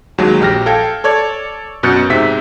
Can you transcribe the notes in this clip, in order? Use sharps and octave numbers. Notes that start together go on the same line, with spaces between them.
D#2 F#3 G#3
A#1 G4 F6 A#6
A4 F5 G5 G#6
A4 C#5 D5 G#6
F#2 B2 F#6 G6 A6 C#7
G#2 C3 E5 B6